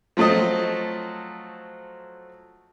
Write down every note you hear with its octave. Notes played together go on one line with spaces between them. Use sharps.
F3 F#3 A3 C4 D#5